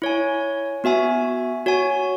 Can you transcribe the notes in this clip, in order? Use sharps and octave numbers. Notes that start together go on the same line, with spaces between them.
E4 C#5 G#5
B3 F#4 E5 G#5
F#4 C#5 G#5